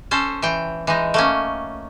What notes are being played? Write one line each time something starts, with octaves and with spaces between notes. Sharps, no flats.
C#4 A4 C5
E3 G5
E3 G#3 D#4
A3 A#3 C#4